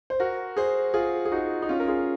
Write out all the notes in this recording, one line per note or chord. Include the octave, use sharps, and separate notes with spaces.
C5
F#4 A#4
G#4 C5
F4 G#4
G#4
D#4 F#4
D#4
C#4 F4
A#4
F4 G#4